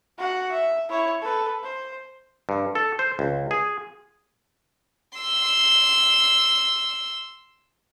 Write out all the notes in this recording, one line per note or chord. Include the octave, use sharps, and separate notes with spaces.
F#4 F#5
E5
E4 C#5
A4 B4
C5
G2
A4
C5
C#2
G#4
C6 E6